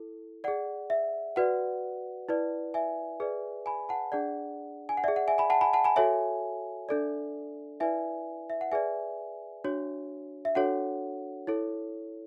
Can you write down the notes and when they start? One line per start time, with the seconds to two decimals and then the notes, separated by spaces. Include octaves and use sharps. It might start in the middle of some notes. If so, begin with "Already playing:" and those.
Already playing: E4 A4
0.44 G#4 D5 F#5
0.90 E5
1.36 F#4 B4 D5 F#5
2.29 E4 B4 D5
2.74 E5 G#5
3.20 G#4 B4 D5
3.66 G#5 B5
3.89 F#5 A5
4.12 D4 G#4 D5 F#5
4.89 G#5
4.97 F#5
5.04 G#4 D5 E5
5.16 F#5
5.28 E5 G#5
5.38 G#5 B5
5.50 F#5 A5
5.61 G#5 B5
5.73 F#5 A5
5.84 G#5 B5
5.96 F#4 A4 C#5 E5 G#5
6.89 D4 A4 D5
7.80 E4 B4 D5 E5 G#5
8.50 E5
8.61 F#5
8.72 G#4 B4 D5 E5 G#5
9.64 D4 F#4 C#5
10.45 E5
10.55 D4 F#4 A4 C#5 F#5
11.47 E4 A4 C#5